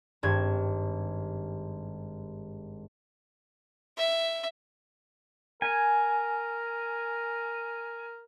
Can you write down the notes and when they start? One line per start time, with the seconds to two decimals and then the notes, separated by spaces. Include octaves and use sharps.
0.23 G#1 G2 G#6
3.98 E5
5.62 A#4 G#5